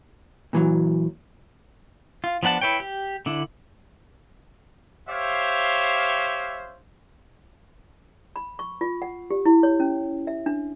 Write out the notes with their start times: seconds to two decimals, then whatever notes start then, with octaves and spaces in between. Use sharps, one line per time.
0.53 A#2 E3 F#3
2.24 F4
2.43 F3 B3 D4 F#5 A5
2.61 E4 B4 C#5 G5
2.80 G4
3.26 D3 D4 E4
5.07 G4 C5 C#5 E5 F5
8.36 B5
8.59 C#6
8.81 F4
9.02 F#5
9.31 G4
9.46 E4
9.63 C#5
9.80 C#4
10.27 E5
10.46 D4